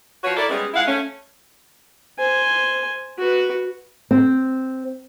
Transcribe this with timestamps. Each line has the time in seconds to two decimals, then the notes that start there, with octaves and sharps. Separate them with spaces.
0.24 F3 F#4 B4 C#5
0.37 E4 A4 A#4 D5
0.49 G3 G#3 B3 C#4 G#4
0.74 G#3 E4 F4 F5 F#5
0.86 A3 C#4
2.19 C5 G#5
3.18 F#4 B4
4.11 C4